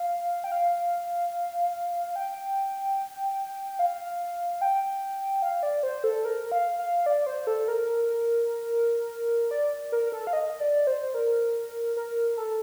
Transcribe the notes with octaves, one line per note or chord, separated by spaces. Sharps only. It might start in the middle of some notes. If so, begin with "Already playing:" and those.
Already playing: F5
G5
F5
G5
F5
G5
F5
D5
C5
A4
A#4
F5
F5
D5
C5
A4
A#4
D5
A#4
A4
F5
D#5
D5
C5
A#4
A#4
A4